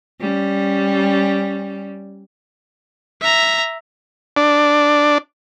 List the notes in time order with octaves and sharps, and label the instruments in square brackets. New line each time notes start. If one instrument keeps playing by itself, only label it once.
[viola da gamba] G3 C#4
[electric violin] E5 A#5
[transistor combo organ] D4